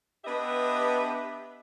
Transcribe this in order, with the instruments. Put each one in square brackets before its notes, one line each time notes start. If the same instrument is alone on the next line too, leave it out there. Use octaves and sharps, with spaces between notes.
[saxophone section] B3 D4 G4 B4 D#5 E5